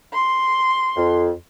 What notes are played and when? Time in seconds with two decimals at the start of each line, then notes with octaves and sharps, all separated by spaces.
0.13 C6
0.96 F2